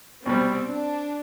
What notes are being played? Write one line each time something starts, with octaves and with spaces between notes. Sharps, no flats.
C2 B2 G3 C4
D4